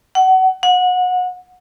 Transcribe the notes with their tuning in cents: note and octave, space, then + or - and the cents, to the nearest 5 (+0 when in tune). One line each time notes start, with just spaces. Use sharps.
F#5 +25
F#5 -25